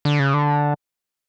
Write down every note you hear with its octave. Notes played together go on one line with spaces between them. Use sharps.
D3
C#3
D3